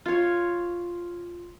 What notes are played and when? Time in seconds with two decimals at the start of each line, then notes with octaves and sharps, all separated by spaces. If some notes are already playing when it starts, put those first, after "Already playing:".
0.06 F4 C#5